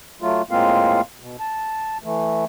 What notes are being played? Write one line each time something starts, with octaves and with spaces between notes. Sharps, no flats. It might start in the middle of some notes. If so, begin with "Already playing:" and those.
F#3 A3 F4
A2 G#3 A#3 C4 F4 F5
B2
A5
E3 A3